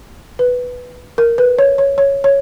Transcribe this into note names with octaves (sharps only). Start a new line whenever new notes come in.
B4
A#4
B4
C#5
C#5
C#5
C#5